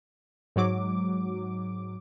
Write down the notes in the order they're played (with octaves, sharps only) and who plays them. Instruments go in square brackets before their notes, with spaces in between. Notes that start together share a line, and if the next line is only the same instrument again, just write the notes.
[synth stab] G#2 F#3 D6